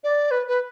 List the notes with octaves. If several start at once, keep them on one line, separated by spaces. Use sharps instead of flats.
D5
B4
B4